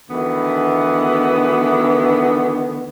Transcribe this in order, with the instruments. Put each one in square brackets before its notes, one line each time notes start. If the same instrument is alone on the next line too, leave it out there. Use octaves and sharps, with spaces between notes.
[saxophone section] D2 D#3 E3 B3